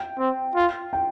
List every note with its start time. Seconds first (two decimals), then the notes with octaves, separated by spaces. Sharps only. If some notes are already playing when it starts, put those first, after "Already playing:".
Already playing: G5
0.19 C4
0.56 F4
0.93 G5